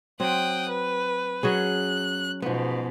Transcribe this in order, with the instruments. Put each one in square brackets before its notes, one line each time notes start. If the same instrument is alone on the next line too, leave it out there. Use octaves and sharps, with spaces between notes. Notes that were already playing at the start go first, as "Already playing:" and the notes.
[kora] F#3 C4 [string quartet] G5 D#6 F#6
[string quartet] B4
[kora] F#3 C#4 G#4 [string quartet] F#6
[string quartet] G#2 B2 [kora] F3 B3